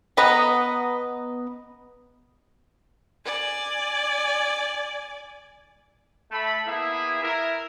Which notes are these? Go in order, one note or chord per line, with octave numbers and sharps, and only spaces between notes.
B3 B4 D#5 A#5
D5 G#5
A3 B5
A#3 B3 E4 G#4 E5
E4 A#4